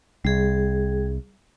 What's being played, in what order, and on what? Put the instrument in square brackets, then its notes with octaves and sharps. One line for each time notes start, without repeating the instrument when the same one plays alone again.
[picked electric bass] C2 [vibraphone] G3 G#4